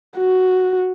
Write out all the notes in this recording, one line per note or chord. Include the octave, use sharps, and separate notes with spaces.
F#4